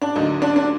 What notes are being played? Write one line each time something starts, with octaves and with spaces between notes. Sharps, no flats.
D4
D2 D3 F#3 A#3 D#4
D4
D4